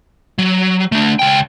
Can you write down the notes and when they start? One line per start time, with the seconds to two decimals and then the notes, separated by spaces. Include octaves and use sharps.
0.38 F#3
0.92 A3 D4
1.19 C#2 G5